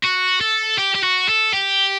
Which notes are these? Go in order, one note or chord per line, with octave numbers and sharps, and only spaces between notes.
F#4
A4
G4
G4
F#4
A4
G4